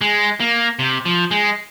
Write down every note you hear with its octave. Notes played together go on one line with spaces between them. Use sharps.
G#3
A#3
C3
F3
G#3